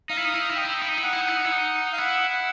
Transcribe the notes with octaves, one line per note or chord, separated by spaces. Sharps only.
D#4 F5
E4
D#4
E4
D#4
E4
D#4 G5
E4
D#4
E4
D#4
E4
D#4 F#5
E4
D#4
E4
D#4
E4
D#4
F5
E4 F#5
F#5